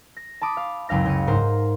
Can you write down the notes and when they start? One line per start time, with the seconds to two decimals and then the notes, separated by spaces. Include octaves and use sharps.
0.17 A#6
0.41 A5 B5 D6 D#6
0.57 F5
0.89 F#1 C#2 F5 A#6
1.06 C#3 C#7 D#7
1.27 G#2 A#4 C5